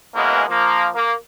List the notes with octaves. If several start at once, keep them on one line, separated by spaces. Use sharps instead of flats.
B2 E3 G#3 A#3 B3 C#4
F3 A#3
A#3